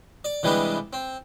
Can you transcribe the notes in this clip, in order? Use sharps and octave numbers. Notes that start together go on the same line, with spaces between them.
D5
C3 E3 G3 G#3 B3 D4
C4